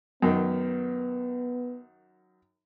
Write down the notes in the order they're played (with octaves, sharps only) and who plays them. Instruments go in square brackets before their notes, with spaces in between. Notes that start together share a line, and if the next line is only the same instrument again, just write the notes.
[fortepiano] F#2 D#3 [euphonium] B3